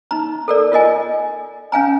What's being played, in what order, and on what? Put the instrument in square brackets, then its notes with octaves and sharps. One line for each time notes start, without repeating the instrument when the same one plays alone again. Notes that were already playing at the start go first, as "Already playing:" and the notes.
[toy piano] D#4 A#5
A4 A#4 D5
F4 A#4 D#5 G#5
C#4 F5 G#5 A#5